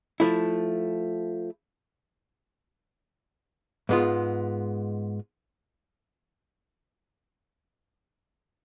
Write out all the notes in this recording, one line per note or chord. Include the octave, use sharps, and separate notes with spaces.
F3 A3 E4
G#2 G#3 B3 F4